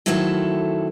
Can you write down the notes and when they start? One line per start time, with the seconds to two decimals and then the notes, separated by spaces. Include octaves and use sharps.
0.06 D#3 F#3 A3 C4 E4 A4